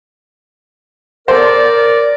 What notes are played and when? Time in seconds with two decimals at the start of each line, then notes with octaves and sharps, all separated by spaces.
1.28 A4 A#4 C5 D5